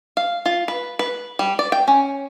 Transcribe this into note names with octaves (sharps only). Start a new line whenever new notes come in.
F5
F4
B4
B4
G3
D5
G5
C#4